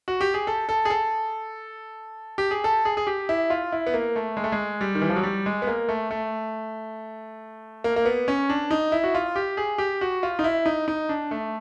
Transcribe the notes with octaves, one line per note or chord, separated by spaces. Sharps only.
F#4
G4
G#4
A4
A4
G#4
A4
G4
G#4
A4
G#4
G#4
G4
E4
F4
E4
B3
A#3
A3
G#3
A3
G#3
G3
D#3
E3
F3
F#3
G3
G#3
B3
A#3
A3
A3
A#3
A#3
B3
C#4
D4
D#4
E4
F#4
F4
G4
G#4
G4
F#4
F4
D#4
E4
D#4
D#4
D4
A3